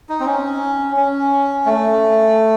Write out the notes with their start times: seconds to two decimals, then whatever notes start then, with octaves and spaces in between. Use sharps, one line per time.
0.09 D#4
0.20 C4
0.26 C#4
0.96 C#4
1.66 A3